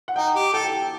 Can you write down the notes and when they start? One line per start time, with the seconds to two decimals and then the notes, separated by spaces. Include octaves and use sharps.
0.08 F#5
0.16 D#4 G5
0.35 G4
0.53 A4 G5